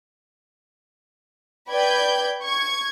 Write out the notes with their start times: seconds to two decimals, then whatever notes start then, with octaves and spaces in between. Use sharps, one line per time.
1.68 B4 D5 G5 B5 G6 G#6
2.43 C#6 G#6